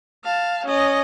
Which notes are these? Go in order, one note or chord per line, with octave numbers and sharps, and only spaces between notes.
F5 A5
C#4 D#5